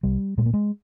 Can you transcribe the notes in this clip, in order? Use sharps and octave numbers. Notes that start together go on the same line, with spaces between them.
C2 G3
A#2 G#3
A#3
G#3